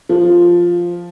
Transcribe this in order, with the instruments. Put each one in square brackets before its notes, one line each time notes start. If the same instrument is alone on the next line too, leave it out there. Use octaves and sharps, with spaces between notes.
[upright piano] F3